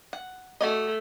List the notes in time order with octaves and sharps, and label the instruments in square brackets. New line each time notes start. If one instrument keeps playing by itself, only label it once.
[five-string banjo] F#5
[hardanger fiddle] A3 [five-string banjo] F#4 D5 D#5